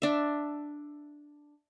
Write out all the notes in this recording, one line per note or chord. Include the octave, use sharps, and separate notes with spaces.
D4 E5